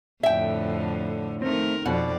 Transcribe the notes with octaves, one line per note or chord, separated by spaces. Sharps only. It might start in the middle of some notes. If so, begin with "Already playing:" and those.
F2 A2 D3 E5 G5
D#3 A3 C4 A#4
F2 B2 D5 F#5